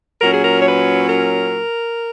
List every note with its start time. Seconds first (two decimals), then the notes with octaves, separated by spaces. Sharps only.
0.20 A#2 F#3 C#4 A#4
0.31 G#4
0.42 A#4
0.61 C#5
0.65 B4
1.09 A#4